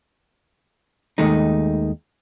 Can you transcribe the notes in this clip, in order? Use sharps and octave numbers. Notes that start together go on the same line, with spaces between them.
D#2 D#3 G#3 A3 D#4